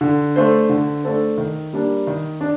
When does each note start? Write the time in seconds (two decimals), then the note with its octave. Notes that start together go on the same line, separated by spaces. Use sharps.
0.01 D3
0.36 A3 D4 A4 C5
0.69 D3
1.04 A3 D4 A4 C5
1.38 D#3
1.73 G3 A#3 D4
2.07 D#3
2.41 D4